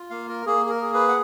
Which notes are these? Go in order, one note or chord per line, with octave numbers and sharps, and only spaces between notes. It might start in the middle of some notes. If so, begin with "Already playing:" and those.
Already playing: F4
A#3 F5
A#4
A#3 G#4
G#4
A#4
G#4
B4
F#5